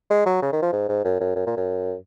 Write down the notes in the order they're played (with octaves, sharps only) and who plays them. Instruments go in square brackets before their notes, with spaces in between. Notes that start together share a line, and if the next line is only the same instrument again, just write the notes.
[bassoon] G#3
F#3
C#3
D#3
F3
G#2
G#2
F#2
F#2
F#2
A#2
F#2